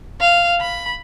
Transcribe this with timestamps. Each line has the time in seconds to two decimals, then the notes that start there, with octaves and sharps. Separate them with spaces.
0.21 F5
0.61 B5